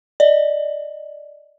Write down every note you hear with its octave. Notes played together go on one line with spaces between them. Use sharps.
D5 D#5